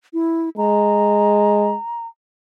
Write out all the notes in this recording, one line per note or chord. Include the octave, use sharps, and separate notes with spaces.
E4
G#3 A#5